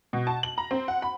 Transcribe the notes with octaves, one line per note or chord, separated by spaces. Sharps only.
B2
A5
F#7
A#5
C4
F#5
B5